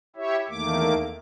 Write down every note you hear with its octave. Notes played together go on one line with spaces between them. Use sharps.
E4 G4 C#5 E5
E2 D#3 A3 A#3 D6